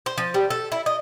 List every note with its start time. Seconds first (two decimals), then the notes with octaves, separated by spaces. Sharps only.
0.06 C5
0.18 F3
0.34 G3
0.50 A4
0.72 E4
0.86 D#5